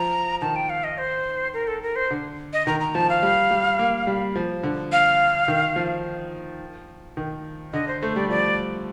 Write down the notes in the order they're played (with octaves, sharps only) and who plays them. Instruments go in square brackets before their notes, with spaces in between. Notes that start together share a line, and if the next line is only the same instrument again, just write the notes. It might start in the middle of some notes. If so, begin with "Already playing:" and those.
Already playing: [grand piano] F3 [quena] A#5
[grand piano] D#3 [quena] A5
[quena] G5
F5
D#5
C5
A#4
A4
A#4
C5
[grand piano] D3
[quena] D#5
[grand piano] D#3 [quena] A#5
[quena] A#5
[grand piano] F3 [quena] A5
[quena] F5
[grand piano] G3
G3
A#3
G3
F3
D3
[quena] F5
[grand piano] D#3
F3
D#3
[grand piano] D3 [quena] D#5
[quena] C5
[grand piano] A3 [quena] C5
[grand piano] G3 [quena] D5
[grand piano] F3 [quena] D5